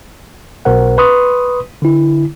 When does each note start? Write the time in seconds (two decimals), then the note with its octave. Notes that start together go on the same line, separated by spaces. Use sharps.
0.65 B1 B2 A#4 C5 F#5
0.98 B4 C6 C#6 D#6
1.82 D3 E4